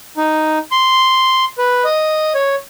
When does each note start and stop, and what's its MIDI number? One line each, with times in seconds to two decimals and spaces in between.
0.17 0.59 63
0.71 1.45 84
1.58 1.84 71
1.85 2.33 75
2.35 2.55 73